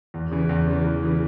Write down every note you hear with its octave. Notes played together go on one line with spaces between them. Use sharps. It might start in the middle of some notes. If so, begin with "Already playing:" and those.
E2
C#3 E3
E2
C#3 E3
E2
C#3 E3